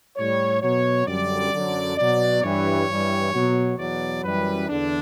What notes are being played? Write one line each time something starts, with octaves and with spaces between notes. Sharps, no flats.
A2 G3 C#5
B2 F#3 C#5
F#2 D3 G3 D5
F#2 D3 F#3
B2 F#3 D5
G2 E3 G3 C#5
G2 E3 G3
B2 F#3
E2 B2 F#3 D5
F#2 E3 G3 B4
E2 D3 D4